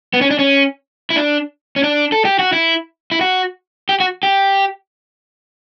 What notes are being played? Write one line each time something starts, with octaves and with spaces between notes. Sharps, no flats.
B3
C#4
D4
C#4
E4
D4
C#4
D4
A4
G4
F#4
E4
E4
F#4
G4
F#4
G4